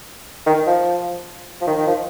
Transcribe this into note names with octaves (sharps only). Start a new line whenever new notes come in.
D#3
F3
F3
D#3
D#3
F3